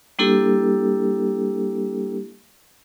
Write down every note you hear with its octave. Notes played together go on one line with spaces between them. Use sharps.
G3 A#3 D4 E4 G4 A4